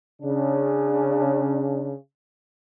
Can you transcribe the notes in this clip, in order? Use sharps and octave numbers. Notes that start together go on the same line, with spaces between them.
C#3 D4